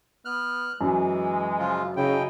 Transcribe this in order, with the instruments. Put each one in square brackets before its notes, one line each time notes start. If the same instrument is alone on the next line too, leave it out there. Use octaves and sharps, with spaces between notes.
[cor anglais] B3 [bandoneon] F6 F#6
[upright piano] F#2 [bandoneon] E3 [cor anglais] G#3
[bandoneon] C#3 F3 F4
[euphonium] C#3 [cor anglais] D#4 [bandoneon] E4 G5